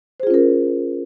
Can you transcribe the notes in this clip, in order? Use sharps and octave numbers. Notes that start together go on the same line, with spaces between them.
C#4 F4 G#4 A#4 C5